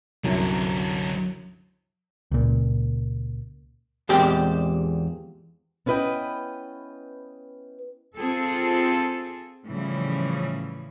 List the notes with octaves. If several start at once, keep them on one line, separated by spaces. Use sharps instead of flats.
C2 F#2 D3 F#3
C#2 A#2
E2 A#2 G#3 C4 G4 G5
B3 C#4 E4 B4 D#5 G5
C4 F4 G#4 A4
A2 C#3 E3 F3 G3